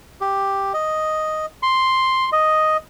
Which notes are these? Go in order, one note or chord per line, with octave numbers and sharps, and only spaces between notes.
G4
D#5
C6
D#5